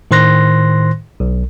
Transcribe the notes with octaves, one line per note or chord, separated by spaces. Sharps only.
A2 D#3 C5 C6 F#6 A#6
B1